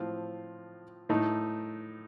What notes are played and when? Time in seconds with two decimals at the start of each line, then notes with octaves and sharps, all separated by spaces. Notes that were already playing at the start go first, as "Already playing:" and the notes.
Already playing: A2 F3 C4 F4
1.09 A2 A3 D#4